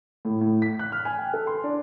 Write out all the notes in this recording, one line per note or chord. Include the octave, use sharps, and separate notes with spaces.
A2
A2
B6
F#6
F6
G#5
G5
A4
C6
D4